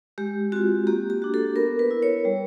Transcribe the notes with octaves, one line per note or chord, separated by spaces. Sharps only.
G#3 G4
C4 F4 F#4
A#3 G4
G4
D4 F#4
A4
B3 A#4
B4
E4
C#5
G3